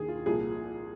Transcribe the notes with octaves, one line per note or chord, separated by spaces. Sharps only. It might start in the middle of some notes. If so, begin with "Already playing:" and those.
Already playing: D#2 D#3 G#4
F4
C2 A#2 F3 G#4